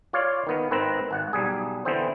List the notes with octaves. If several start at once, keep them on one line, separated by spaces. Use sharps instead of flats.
F4 C#5 D5 F5
D#3 B3
G#1 D#3 C4 B4 A#5
G#1 F#5
B1 G3 G#4
D3 E3 B3 C4 C5